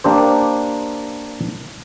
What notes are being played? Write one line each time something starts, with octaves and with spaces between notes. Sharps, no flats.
A#3 D4 G4 C5